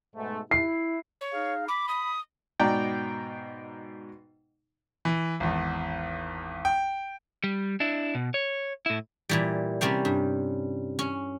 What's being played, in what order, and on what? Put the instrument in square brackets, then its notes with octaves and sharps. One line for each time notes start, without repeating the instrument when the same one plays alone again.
[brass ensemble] G#2 B2 A3
[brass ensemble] E4 [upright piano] C7
[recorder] C#5
[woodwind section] D#4 G#4 F5
[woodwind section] B5 [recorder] D6
[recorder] D#6
[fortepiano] G#2 B2 D#4 D5 G5 A#5
[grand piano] E3
G#1 E2
G5
[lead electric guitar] G3
D4 E4
B2
C#5
A2 E4
[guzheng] A#2 E3 G3
C3 G3 C4 C#4 C5
G2
C#4